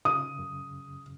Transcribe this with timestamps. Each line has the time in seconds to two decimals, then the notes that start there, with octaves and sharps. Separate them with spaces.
0.05 C#3 D#6
0.39 F#2